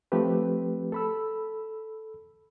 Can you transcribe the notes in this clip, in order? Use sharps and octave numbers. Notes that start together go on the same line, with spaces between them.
F3 A3 C4 G4 B4
A4 B5 E6